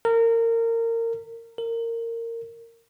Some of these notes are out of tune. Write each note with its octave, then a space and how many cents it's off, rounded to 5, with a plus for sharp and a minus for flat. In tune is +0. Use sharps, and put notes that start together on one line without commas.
A#4 -25
A#4 -20